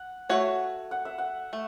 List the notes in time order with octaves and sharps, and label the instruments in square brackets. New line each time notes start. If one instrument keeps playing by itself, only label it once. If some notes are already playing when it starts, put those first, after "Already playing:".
Already playing: [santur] F#5
[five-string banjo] A3 F#4 C#5
[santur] F#5
E5
F#5
[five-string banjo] A3